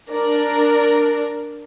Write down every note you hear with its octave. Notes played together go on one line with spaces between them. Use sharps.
D4 A#4 D5